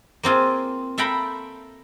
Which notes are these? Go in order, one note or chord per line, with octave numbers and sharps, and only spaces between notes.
A#3 C4 F4 G#4
A4 E5 F5 G5 A#5 B5